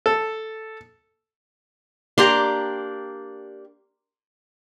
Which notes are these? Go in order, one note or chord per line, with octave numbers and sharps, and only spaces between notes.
A4
A#3 D4 G4 A#5 C6